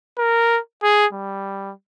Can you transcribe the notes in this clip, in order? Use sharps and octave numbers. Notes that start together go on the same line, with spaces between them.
A#4
G#4
G3